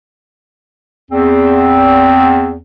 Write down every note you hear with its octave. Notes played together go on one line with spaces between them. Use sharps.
E2 C4